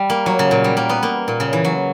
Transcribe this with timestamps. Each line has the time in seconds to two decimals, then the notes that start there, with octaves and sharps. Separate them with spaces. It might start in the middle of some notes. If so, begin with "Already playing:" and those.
Already playing: G3
0.10 A#3
0.26 F#3
0.39 C#3
0.51 A#2
0.64 G3
0.77 A#3
0.89 B3
1.03 A#3
1.28 A#2
1.40 C#3
1.53 E3
1.65 F#3